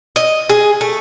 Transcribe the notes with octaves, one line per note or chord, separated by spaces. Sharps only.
D#5
G#4
A3